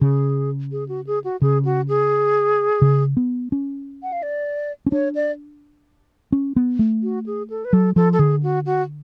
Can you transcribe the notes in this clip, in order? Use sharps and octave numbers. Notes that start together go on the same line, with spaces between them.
C#3 G#4
G#4
F#4
G#4
F#4
C#3 G#4
F#4
G#4
C#3
B3
C#4
F#5
F5
D5
C#4
D4 C#5
D5
C#4
B3
A3
F#4
G#4
A4
B4
F#3 A4
F3 A4
A4
D3 G#4
F#4
F#4